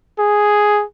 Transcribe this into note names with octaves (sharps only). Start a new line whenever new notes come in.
G#4